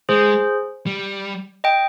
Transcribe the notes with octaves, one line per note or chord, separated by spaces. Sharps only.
G#3 G#4 C5
G3
D#5 G5